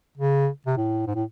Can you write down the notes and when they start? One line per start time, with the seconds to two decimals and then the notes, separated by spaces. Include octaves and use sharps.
0.17 C#3
0.66 C3
0.77 A2
1.06 G#2
1.15 A2